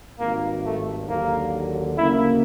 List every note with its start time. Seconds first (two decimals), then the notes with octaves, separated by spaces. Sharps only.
0.20 G#1 G2 D#3 A#3
0.65 A3
1.09 D#2 D3 F#3 A#3
1.98 D2 C#3 F#3 A#3 E4